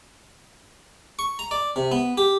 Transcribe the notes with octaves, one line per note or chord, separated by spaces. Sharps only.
C#6
A#5
D5
C3
B3
G4